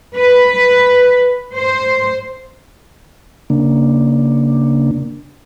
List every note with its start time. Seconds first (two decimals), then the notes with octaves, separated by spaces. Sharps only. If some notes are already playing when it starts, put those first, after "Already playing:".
0.17 B4
1.55 C5
3.50 C#3 A#3 D4